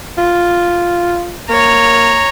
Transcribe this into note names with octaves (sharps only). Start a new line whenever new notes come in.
F4
A#3 C#5 A#5